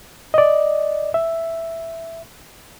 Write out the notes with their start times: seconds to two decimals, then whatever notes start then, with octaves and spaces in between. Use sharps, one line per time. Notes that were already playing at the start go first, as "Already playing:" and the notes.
0.34 D5 D#5
1.14 E5